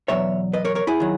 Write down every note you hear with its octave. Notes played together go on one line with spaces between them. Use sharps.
E2 B2 F#3 C#5 E5
B4 D#5
A#4 C#5
A#4 C#5
E4 G#4
D#3 F#3